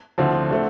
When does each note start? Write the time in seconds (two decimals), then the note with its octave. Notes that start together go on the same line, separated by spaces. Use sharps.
0.18 D2 D3 F3 C4 E4
0.51 D3 A3 C4